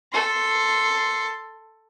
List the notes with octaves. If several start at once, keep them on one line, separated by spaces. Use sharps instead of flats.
A4 C6